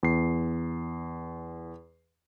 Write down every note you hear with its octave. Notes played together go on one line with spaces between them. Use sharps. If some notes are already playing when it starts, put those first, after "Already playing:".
E2 C7